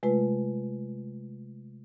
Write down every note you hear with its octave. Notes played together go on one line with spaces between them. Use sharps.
C3 G#3 A3 F4 B4